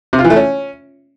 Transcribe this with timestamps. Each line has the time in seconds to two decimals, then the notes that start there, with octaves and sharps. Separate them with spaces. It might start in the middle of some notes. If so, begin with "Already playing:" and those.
0.13 C3
0.19 F4
0.24 E3
0.30 A3
0.36 C#4